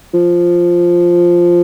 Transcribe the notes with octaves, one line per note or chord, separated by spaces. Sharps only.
F3